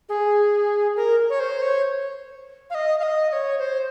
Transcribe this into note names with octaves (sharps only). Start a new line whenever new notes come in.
G#4
A#4
C#5
C5
C#5
F5
D#5
F5
D#5
D#5
C#5
C5